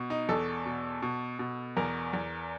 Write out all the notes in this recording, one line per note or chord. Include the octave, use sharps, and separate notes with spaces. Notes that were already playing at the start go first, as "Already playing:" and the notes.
Already playing: B2
D#4
E2 A4
B2
B2
B2
E2 A#4
E2